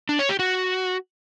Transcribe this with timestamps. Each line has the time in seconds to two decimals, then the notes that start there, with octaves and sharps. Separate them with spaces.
0.09 D4
0.19 C#5
0.29 G4
0.39 F#4